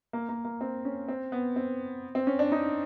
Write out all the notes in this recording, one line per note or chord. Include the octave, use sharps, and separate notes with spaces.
A#3
A#3
A#3
C4
C#4
C4
B3
C4
C4
C#4
D4
D#4